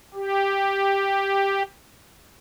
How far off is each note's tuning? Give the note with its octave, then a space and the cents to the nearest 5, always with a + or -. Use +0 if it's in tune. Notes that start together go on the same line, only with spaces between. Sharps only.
G4 +5